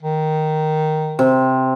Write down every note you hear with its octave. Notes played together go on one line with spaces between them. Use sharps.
D#3
C3